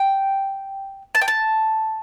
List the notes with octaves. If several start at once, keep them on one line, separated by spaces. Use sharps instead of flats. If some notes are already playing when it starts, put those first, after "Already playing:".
Already playing: G5
A5
G5
A5